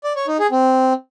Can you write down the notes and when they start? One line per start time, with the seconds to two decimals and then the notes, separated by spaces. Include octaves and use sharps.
0.04 D5
0.16 C#5
0.28 D#4
0.39 G#4
0.51 C4